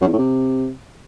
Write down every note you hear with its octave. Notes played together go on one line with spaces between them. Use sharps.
F#2
E2
A2
C3